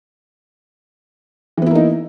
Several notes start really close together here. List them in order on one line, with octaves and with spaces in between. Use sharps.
E3 B3 E4 A#3 D#4